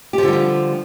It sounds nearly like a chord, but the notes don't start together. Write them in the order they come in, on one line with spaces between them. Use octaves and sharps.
G4 F3 D3 G3 F4